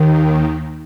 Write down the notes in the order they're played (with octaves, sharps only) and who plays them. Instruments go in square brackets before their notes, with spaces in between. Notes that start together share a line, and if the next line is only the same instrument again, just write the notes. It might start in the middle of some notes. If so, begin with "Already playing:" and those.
Already playing: [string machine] D#2 D#3